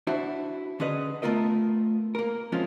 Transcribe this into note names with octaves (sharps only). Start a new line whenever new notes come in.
D4 E4 F#4 C5 E5
D3 C#4 G#4 B4 D#5
A3 B3 F4 A#4 D#5
A#3 A#4
F3 G#3 C4 C#4 F4